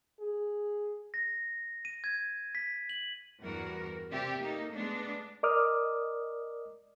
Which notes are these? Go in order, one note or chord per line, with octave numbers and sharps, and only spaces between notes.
G#4
A#6
D#7
G#6
B6
F#7
E2 G2 F#4 A#4
C3 C4 G4 D5 E5
A#3 D#4 A4
G#3 A3 B3 D4
A#4 D5 D#5 D6 D#6 F6